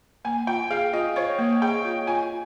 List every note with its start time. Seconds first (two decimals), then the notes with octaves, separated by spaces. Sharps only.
0.25 A#3 G#5
0.47 F4 G5
0.71 G#4 F5
0.93 F4 D#5
1.16 C5 C#5
1.39 A#3
1.62 G#4 G5
1.84 F4
2.07 F4 G#5